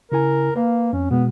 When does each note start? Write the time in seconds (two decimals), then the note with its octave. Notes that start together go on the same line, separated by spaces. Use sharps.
0.12 C#3 E4 A#4 G#5
0.56 A#3 B4 F5
0.93 F2 C#4
1.11 B2 G#3 B3